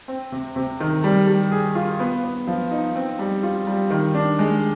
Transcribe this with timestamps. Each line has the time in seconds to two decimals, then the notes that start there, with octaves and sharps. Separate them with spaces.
0.08 C4
0.32 C3
0.56 C3
0.80 D#3
1.04 G3
1.27 G3
1.52 G#4
1.75 F4
2.00 B3
2.24 B3
2.47 F3
2.71 D#4
2.96 C4
3.19 G3
3.43 F4
3.67 G3
3.90 D#3
4.15 D4
4.39 G#3